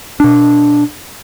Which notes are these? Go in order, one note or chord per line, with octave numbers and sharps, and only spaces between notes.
B2 D4